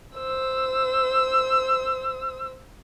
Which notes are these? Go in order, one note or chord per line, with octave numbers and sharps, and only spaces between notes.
C5 E6